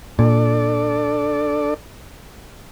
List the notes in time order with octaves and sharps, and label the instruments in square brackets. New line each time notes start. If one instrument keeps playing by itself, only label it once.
[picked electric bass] A#2 [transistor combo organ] D4 A4 D5